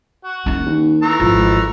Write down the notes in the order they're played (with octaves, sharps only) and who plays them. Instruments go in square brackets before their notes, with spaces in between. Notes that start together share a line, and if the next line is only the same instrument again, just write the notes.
[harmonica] F#4
[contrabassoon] F#1 [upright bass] C#4 D#4
[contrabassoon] D#2
[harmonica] E3 A3 A#5
[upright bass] G#1 [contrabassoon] F3